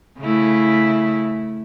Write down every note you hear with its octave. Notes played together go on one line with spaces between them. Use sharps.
C#3 A3 E4